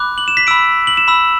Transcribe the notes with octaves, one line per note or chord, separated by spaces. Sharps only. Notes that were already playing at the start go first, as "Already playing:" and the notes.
Already playing: B5 D6 F#6
F#7
E7
B6
B5 E6 D7
F#7
E7
B5 E6